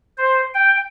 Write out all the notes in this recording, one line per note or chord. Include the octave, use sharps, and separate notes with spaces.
C5
G5